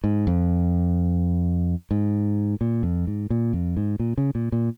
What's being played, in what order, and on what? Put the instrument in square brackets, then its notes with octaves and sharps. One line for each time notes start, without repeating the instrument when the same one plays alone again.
[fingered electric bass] G#2
F2
G#2
A#2
F2
G#2
A#2
F2
G#2
A#2
C#3
A#2
A#2